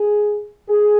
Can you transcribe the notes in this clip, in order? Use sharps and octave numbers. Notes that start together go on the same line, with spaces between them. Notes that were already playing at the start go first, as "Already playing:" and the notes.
Already playing: G#4
G#4